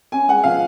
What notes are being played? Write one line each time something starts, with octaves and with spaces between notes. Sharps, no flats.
C#4 G#5
G#3 F#5
F3 F5